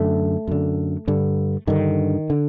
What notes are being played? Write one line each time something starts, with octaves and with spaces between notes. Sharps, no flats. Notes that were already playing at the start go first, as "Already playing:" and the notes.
Already playing: F#2 D3 A3
F#2 D3
G2 D3
G2 D3 D#3
D3